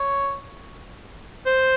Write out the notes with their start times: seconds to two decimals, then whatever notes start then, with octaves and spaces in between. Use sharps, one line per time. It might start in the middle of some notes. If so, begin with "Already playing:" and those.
Already playing: C#5
1.46 C5